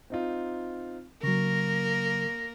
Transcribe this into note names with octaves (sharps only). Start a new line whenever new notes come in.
C4 D#4 F4
C#3 F#3 A#3 A#4 C#6 A#6